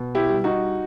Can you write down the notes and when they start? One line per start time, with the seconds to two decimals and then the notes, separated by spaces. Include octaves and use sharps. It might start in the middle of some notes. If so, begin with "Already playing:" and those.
Already playing: B2
0.15 E4 G4
0.29 G3
0.44 D#4 F#4